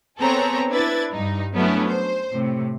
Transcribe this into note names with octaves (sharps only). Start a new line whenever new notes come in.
B3 C4 G#4 A4 C#5 A#5
D4 E4 B4 G#6 A6
G2 D#4
F#3 A3 B3 C#4 D4 E4
C5
A2 C3